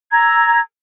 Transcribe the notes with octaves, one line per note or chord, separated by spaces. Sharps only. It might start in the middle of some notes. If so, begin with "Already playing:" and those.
A#5 E6 G#6